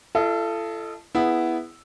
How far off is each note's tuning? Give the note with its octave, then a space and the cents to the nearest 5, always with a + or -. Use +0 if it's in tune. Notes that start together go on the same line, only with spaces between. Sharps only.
F4 -45 A4 +0 D#5 +0
B3 +0 E4 +0 G#4 +0